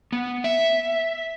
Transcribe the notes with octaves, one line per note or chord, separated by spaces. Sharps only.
B3
E5